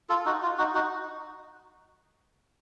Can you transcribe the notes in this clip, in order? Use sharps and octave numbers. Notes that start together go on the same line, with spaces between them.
F4 A4
D#4 F#4
F4
D#4 F#4
D#4 F#4